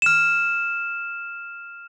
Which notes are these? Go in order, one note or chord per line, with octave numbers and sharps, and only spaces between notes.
F6 E7